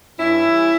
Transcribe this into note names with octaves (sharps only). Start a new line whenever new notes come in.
G2 C#4 E4
E3 G3